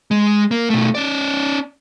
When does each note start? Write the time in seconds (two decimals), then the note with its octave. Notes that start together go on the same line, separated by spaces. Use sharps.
0.11 G#3
0.51 A#3
0.70 B2 A3
0.95 C#4 D5